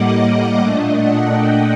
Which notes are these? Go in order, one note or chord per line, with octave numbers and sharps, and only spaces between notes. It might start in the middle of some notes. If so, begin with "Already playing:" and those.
Already playing: A2 G3 A#3 D#5 F#5 D6
A#2 A3 D4 D#5
F#5
G5